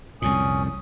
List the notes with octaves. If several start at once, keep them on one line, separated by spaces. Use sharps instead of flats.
C2 F2 A#2 C#4 D#6